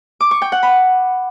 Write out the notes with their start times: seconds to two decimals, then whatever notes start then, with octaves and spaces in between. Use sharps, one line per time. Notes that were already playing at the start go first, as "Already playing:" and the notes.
0.21 D6
0.31 C#6
0.42 G5
0.52 F#5
0.63 B5